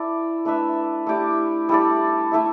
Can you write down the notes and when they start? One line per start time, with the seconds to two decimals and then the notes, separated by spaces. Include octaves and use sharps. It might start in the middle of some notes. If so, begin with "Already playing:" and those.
Already playing: E4 A4 D5
0.45 A3 D4 B4 E5
1.07 A3 E4 G4 D5
1.69 G3 E4 A4 D5
2.32 A3 E4 A4 E5